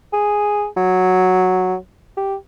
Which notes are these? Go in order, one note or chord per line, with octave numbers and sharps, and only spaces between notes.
G#4
F#3
G4